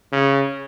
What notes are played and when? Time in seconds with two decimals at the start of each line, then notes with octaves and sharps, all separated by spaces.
0.12 C#3